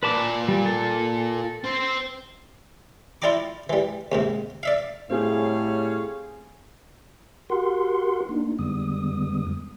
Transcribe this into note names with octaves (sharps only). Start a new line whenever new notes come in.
A#2 B4 D5 A5 D6
G3
A4
C4 C5
E4 F4 D5 G5 A#5 D6
E3 G3
D#2 G#2 C3
D5 E5 F5
A2 G3 C4 G#4 C#5 F5
F#4 G4 A#4 F#5 C6
A#3 D4 D#4
F2 D3 G3 G#3 B3 D#6